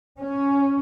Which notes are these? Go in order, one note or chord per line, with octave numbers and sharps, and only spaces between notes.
C#4